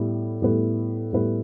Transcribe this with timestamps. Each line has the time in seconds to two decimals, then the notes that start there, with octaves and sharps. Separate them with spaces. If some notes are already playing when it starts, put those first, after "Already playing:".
Already playing: A2 G3 B3 E4
0.42 A2 G3 B3 E4 B4
1.13 A2 G3 B3 E4 B4